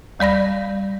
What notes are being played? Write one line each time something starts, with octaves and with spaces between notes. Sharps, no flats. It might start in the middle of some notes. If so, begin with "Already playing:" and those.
D2 G3 D5 B5 A#6